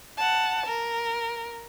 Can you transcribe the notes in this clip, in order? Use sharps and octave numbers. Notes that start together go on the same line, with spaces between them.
F#5 A5
A#4